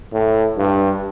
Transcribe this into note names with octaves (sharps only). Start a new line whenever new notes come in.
A2
G2